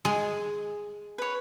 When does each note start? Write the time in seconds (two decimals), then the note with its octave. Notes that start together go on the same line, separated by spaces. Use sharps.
0.05 G#3 G#4 G#5
1.18 B4 C#5